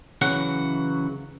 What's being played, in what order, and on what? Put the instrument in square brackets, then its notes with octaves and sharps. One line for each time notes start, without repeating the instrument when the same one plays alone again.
[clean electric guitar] C#3 E3 F#3 F#5